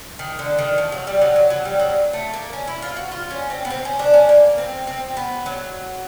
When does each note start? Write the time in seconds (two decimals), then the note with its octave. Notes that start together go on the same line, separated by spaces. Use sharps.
0.19 D#3
0.39 D3
0.59 D#3
0.78 F3
0.92 F#3
1.07 G3
1.21 F#3
1.36 F#3
1.50 F#3
1.65 G3
1.79 F#3
2.13 A3
2.34 A#3
2.53 C#4
2.68 E4
2.82 F4
2.96 F#4
3.12 F4
3.30 C#4
3.50 C4
3.65 B3
3.70 C4
3.85 C#4
3.99 D4
4.14 C#4
4.29 A#3
4.58 C4
4.87 C4
5.17 B3
5.46 F#3